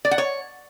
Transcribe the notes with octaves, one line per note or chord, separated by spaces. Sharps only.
D5
F#5
C#5